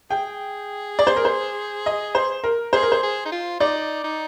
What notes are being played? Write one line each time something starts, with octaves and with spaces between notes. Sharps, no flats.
G#4 G5
D5
C5
A#4
C5
D#5
C5
A#4
G#4 C5
A#4
C5
G#4
D#4
F4
D#4 D5
D#4